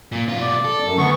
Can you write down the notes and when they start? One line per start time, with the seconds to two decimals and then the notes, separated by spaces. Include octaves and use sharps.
0.12 A#2
0.29 B2 F4
0.41 D5
0.65 A4
0.84 F#2
0.98 D2 B3 C#6